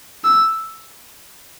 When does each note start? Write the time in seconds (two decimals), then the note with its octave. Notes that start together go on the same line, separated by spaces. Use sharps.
0.24 E6